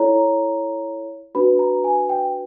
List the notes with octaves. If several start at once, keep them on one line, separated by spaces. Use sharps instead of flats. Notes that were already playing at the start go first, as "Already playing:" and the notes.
Already playing: E4 A4 C#5 A#5
D4 F#4 B4 B5
A#5
G#5
G5